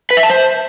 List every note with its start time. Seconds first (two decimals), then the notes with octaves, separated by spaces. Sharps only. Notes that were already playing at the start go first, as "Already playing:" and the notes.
0.11 B4
0.17 E5
0.23 A5
0.30 C5